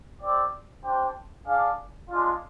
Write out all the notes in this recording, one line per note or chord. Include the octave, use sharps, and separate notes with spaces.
C4 G4 D5
D4 G4 C5 G5
D4 G#4 D5 F5
G#3 D4 F4